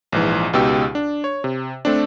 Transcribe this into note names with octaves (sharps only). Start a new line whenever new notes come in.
A#1 G#2 E3
C#2 B2 D#4 G4 E6
D4
C#5
C3
A3 C4 D4